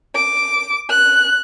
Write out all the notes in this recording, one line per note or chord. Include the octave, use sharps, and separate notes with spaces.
D6
F#6